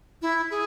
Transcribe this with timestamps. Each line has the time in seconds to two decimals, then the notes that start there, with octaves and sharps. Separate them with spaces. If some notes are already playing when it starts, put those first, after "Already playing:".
0.22 E4
0.50 G#4